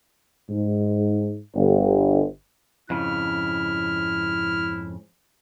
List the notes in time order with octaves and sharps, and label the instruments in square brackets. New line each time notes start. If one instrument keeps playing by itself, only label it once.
[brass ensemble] G#2
G1
[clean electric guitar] F2 G#2 C#3 [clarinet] E4 [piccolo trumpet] F6